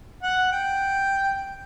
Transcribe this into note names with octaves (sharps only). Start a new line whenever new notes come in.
F#5
G5